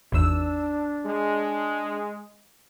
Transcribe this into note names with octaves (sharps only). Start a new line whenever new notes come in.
G#1 E2 D4 E6
G#3